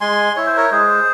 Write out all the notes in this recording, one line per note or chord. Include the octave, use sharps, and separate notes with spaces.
G#3 G#5 C6
E4 C#5
C5
A#4 C#5
G#3 G#4 C5